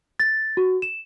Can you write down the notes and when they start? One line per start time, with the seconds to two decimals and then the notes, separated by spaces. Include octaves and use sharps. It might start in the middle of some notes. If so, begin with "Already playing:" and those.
0.20 A6
0.57 F#4
0.82 E7